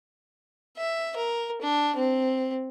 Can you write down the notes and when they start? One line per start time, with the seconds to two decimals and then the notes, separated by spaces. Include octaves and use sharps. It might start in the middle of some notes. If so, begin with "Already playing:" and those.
0.77 E5
1.16 A#4
1.62 D4
1.96 C4